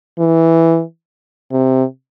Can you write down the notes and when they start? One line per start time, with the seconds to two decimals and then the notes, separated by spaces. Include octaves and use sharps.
0.19 E3
1.52 C3